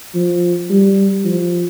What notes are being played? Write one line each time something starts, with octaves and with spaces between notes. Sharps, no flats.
F3
G3
F3